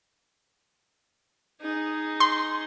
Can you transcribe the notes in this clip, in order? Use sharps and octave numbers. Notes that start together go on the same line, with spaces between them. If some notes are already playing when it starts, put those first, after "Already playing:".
D#4 G#4
C6